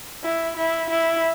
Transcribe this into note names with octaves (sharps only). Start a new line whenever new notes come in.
E4
E4
E4